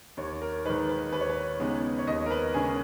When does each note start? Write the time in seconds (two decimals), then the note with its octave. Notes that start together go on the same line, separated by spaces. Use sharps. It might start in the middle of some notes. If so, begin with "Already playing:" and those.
0.17 D#2 C#5
0.42 A#4
0.65 D#3 G#3 D#4 B4
0.89 B4
1.12 D#2 B4
1.21 C#5
1.30 B4
1.60 C#3 G#3 B3 D#4
1.98 C#5
2.07 D#2 D#5
2.26 A#4
2.30 B4
2.54 C#3 G#3 C#4 G#4